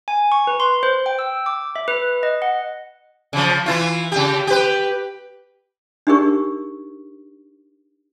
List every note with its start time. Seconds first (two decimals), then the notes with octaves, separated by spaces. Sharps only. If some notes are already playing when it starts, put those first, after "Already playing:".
0.08 G#5
0.32 C#6
0.47 B4
0.60 C6
0.83 C5
1.06 G5
1.19 E6
1.46 D6
1.76 E5
1.88 B4
2.23 D#5
2.42 F#5
3.33 C#3 F3
3.66 E3 E4 F4
4.12 C#3 G4
4.47 G4 B4
6.07 D4 D#4 G4 G#4 A#4 C#6